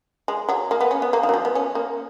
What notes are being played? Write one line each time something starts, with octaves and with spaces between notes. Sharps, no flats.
G#3
F#3
A#3
B3
C#4
B3
A#3
D#3
F#3
F3
B3
C#4
A#3